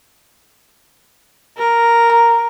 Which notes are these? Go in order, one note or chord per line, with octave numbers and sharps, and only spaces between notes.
A#4
A#5